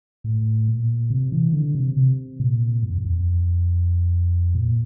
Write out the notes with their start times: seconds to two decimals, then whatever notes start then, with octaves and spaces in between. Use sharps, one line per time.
0.24 A2
0.68 A#2
1.10 C3
1.32 E3
1.53 D3
1.75 C3
1.97 C3
2.40 A#2
2.83 G2
2.90 F2
2.97 E2
3.05 F2
4.55 A#2